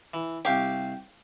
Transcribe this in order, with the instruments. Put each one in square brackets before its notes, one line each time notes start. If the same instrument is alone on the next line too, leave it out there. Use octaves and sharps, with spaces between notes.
[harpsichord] E3
[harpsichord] C2 F5 C#6 [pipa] G4